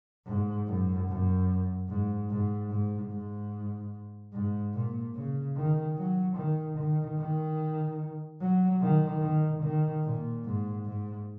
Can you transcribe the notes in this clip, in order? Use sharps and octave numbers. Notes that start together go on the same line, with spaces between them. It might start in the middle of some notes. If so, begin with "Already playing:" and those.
G#2
F#2
F#2
G#2
G#2
G#2
G#2
G#2
A#2
C#3
D#3
F#3
D#3
D#3
D#3
F#3
D#3
D#3
D#3
A#2
G#2
G#2